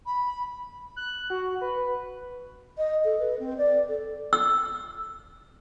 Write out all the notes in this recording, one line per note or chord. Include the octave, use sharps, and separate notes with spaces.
B5
F#6
F#4
B4
D#5
A4
B4
C4
D5
A4
E6